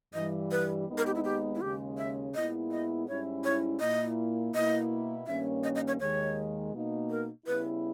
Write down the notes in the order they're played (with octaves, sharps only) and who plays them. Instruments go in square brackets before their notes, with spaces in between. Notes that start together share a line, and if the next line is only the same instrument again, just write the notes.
[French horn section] G2 E3 G3 [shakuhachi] D#5
[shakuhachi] B4
[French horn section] D#2 D#3 G#3 B3 D#4
[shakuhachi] A#4
G4
E4
G4
E4
[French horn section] D#2 C#3 G#3 C#4 [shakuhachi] G4
[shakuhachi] E5
[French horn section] A#2 G#3 B3 E4 [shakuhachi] D#5
[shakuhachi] D#5
[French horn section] G#2 G3 C#4 E4 [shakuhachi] C#5
[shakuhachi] C#5
[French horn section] A#2 A#3 E4 [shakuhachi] D#5
[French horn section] B2 A#3 E4 [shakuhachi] D#5
[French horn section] G2 D#3 A#3 C#4 [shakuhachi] E5
[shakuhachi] D#5
D#5
C#5
[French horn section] D#2 D#3 G#3 [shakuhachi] C#5
[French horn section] B2 A#3 D#4
[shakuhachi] A#4
[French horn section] C#3 G3 B3 E4 [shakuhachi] B4